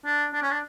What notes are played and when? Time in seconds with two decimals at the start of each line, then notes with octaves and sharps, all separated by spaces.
0.05 D4
0.34 D4
0.43 C#4
0.51 D4